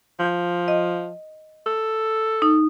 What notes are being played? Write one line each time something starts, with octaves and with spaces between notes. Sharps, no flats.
F3
D#5
A4
D#4